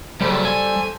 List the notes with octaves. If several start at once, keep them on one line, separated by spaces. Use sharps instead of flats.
F#2 C#3 G3 A4 C5
G#5